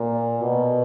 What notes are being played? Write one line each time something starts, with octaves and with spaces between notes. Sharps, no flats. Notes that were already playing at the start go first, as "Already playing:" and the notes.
Already playing: A#2
B2